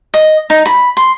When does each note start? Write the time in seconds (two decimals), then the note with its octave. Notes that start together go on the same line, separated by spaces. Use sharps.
0.14 D#5
0.50 D#4
0.66 B5
0.97 C6